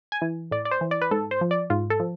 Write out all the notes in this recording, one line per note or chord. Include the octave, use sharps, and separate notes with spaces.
G#5
E3
A2 D5
D5
C5
E3
D5
B4
G#2 A4
C5
F3
D5
G#2 F4
A4
F3